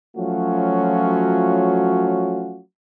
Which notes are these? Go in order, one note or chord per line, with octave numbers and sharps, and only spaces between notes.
F3 F#3 A3 C#4 F4 F#4